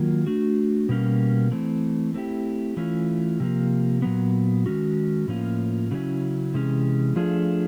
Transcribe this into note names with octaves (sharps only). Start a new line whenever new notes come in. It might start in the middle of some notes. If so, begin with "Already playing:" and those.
Already playing: D#3 F#3 A#3 F4
A3 D4 F#4
B2 G3 A#3 C#4
E3 A3 C4
A3 C4 E4 G4
E3 A3 C#4 F4
C3 F3 A#3
A#2 F#3 B3
D#3 G#3 C#4 F#4
A2 F3 A#3 C#4 F4
C#3 F#3 A3 C#4 E4
C3 E3 G#3 C#4
F3 A3 D4 F4 G#4